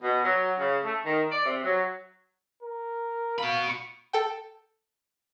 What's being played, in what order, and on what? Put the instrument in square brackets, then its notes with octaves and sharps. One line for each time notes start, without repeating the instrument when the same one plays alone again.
[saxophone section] B2
F#3
C#3
A3
D#3
D5
C3
F#3
[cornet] A#4
[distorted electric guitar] F#4 B5 [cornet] F5
[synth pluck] A4 G5